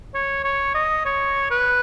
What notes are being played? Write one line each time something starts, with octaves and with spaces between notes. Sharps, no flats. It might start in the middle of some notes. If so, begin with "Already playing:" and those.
C#5
C#5
D#5
C#5
B4